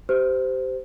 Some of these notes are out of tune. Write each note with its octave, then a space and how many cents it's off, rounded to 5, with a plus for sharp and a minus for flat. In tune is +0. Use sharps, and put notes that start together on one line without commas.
G4 -15 C5 -20